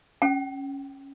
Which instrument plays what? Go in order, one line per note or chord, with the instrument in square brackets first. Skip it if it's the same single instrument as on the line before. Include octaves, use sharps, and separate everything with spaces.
[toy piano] C#4 G5